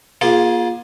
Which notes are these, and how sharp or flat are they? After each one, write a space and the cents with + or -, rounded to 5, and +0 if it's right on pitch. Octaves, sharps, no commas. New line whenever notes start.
A#3 +35 F4 +0 G#4 +0